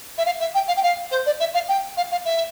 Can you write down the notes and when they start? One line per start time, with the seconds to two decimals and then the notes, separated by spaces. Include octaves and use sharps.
0.18 E5
0.26 F5
0.40 E5
0.55 G5
0.68 F5
0.77 G5
0.83 F5
1.11 C5
1.26 D5
1.40 E5
1.54 F5
1.69 G5
1.97 F5
2.12 F5
2.25 E5